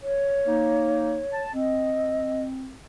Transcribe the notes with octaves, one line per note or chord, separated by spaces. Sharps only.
C#5
A#3 D#4
A5
C4 D#5